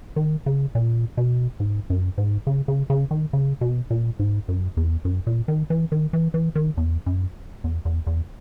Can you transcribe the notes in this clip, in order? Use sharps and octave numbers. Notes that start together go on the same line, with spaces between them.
D#3
C#3
A#2
B2
G#2
F#2
G#2
C#3
C#3
C#3
D#3
C#3
B2
A#2
G#2
F#2
E2
F#2
A#2
D#3
E3
D#3
E3
E3
D#3
E2
F#2
E2
E2
E2